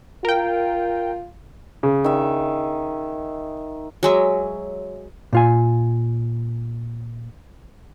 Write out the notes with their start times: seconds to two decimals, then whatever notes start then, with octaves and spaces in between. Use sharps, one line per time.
0.25 F4 A#4 G5
1.83 C#3
2.04 D#3 E5
4.03 F#3 G#3 E5
5.33 A#2 F4 G#5